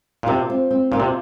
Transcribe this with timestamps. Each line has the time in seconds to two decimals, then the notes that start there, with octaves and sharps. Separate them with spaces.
0.23 A#2
0.27 C3 F4
0.50 C4
0.71 C4
0.92 A#2 F4
1.00 C3